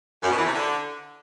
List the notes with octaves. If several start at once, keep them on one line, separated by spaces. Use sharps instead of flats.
F#2
B2
E3
C3
D3